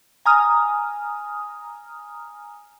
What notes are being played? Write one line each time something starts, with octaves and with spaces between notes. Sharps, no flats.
G#5 A#5 D#6 F6